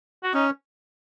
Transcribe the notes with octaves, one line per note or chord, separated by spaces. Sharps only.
F#4
C#4 D#4